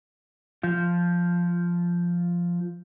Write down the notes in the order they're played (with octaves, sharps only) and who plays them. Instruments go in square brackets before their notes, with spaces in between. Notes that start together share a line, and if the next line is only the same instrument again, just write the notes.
[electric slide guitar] F3 F4